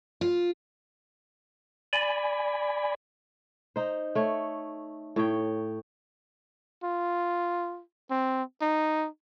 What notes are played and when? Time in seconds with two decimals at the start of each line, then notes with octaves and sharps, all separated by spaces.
0.21 F4
1.93 D5 G#5 B5
3.76 D#4 C5
4.15 A3 C#5
5.16 A2 C#5 G5
6.84 F4
8.11 C4
8.62 D#4